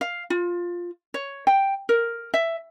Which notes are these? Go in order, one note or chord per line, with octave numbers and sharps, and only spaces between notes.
F5
F4
C#5
G5
A#4
E5